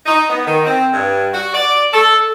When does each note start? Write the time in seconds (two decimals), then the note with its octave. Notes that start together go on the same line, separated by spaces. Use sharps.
0.05 D#4
0.29 B3
0.46 D#3
0.65 C4
0.94 G2
1.33 F#4
1.54 D5
1.93 A4